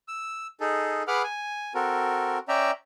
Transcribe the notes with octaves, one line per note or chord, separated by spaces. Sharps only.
E6
D#4 G#4 A4
G#4 B4 F#5 B5 D6 F6
G#5
C4 F#4 A4 A#4
C#4 D5 E5 G5 A#5